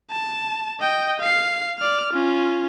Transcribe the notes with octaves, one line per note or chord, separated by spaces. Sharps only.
A5
D#5 G5
F5 C7
D5 F6
C#4 F4